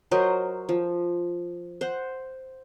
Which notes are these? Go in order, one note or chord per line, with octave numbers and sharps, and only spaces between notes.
F#3 A#4 C5 D#5
F3
C5 F#5